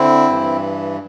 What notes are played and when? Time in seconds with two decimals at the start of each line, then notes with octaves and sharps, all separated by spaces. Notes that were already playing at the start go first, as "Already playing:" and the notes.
Already playing: D3 C4 E4
0.29 G2 E3